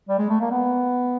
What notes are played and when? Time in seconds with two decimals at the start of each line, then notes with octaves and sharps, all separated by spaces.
0.09 G3
0.19 G#3
0.29 A3
0.40 A#3
0.51 B3